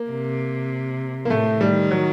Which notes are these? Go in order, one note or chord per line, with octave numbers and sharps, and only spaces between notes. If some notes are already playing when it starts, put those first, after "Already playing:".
Already playing: A#3
C3
A#3
A2 A3
D#3 G3
F#3